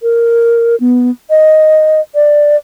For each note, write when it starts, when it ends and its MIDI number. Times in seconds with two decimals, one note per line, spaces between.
0.02 0.76 70
0.80 1.10 59
1.30 2.01 75
2.15 2.56 74